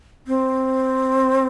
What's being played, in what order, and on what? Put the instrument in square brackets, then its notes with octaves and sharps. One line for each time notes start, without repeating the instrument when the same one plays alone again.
[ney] C4